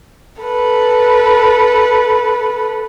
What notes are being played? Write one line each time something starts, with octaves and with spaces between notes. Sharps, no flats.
A4 B4